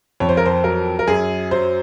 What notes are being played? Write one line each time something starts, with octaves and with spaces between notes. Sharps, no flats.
F2 C#5
C5
A#4
C5
F#3 A#4
A#4
F#2 G#4
F#3 C5